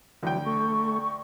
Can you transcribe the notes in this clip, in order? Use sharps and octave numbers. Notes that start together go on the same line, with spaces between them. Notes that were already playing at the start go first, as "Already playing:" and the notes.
D2 E3 F#3 G5
A3 C#6